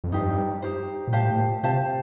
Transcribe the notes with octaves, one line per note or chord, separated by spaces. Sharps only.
F2
G2 D#4 G4 C5
D#4 G4 C5
A#2
A2 G4 C5 F5 A5
A2
A#2
C3 G4 C5 F5 A5